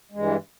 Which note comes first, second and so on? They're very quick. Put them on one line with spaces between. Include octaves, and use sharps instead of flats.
G#3 G2 E3